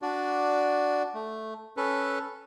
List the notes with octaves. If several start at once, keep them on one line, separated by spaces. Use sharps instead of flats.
D4 F#4 D5
A3
C#4 A4 B4